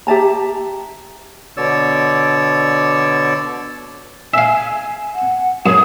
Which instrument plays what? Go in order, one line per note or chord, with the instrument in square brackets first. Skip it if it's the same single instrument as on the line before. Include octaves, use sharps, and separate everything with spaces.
[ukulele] G4 E5 A5 A#5
[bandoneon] B2 D3 C#5 D5 E6
[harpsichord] E5 F5 [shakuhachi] G#5
[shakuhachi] F#5
[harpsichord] F#2 [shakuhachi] D#6